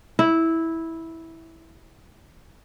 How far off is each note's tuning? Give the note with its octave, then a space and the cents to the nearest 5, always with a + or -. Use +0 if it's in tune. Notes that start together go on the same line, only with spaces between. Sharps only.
E4 -10